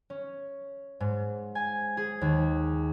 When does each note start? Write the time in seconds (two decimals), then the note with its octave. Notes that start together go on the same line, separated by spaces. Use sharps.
0.10 C#4
1.00 G#2
1.55 G#5
1.97 G#4
2.21 D#2